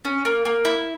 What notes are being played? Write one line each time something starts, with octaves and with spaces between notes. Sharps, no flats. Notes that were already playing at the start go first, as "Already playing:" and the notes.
C#4
A#3
A#3
E4